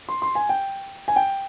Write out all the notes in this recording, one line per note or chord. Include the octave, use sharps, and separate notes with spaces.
C6
C6
G#5
G5
G#5
G5